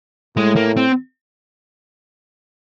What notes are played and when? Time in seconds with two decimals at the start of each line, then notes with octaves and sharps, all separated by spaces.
0.36 A2 G#3
0.56 A#3
0.77 C4